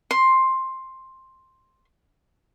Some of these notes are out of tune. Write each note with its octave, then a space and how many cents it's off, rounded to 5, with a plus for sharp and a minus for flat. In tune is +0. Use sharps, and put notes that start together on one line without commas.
C6 +10